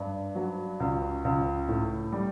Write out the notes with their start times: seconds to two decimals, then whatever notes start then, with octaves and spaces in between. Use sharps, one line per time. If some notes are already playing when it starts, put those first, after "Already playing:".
Already playing: G2
0.35 F#3
0.80 C#2
1.25 C#2
1.68 A2
2.12 G3